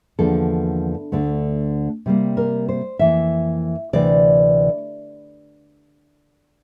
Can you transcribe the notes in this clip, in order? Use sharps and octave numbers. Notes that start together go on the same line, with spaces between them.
E2 D3 F3 A#3 A4
D2 D3 A3
C3 G3 A#3
A#4
C5
F2 E3 A#3 E5
D2 C3 E3 D5